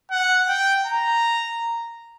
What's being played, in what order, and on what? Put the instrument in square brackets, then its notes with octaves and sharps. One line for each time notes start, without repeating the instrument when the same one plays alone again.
[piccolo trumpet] F#5
G5
A#5